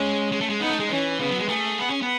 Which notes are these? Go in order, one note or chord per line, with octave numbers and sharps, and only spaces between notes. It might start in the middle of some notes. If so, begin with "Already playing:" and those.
Already playing: G#3 C#4
G#3
A3
G#3
B3 D#4
A3
G#3
E3 C#4
C#3 B3
F#3
G#3
A3 G#4
B3
C#4
B3